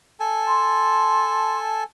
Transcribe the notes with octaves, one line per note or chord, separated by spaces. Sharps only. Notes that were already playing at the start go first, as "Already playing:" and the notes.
A4 G#5 A5
C6